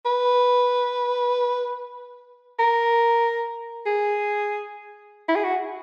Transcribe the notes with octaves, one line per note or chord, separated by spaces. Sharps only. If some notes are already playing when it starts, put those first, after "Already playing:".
B4
A#4
G#4
E4
G#4
F#4